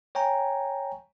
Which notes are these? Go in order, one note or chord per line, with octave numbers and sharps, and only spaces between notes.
C#5 G5 G#5 A#5